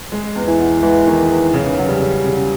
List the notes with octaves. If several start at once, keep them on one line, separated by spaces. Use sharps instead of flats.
G#3
E2
E3
B3
E3 G#3
E2 D#3
E2
C#3
F#3
G3
C#3
C#3